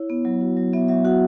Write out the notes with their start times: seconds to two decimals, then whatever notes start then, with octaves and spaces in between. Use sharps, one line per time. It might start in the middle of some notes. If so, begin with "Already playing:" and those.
Already playing: E4 C#5
0.10 B3
0.25 F#3
0.41 F#4
0.57 F#3
0.73 B3 E5
0.88 F#3 E5
1.05 F#4 F#5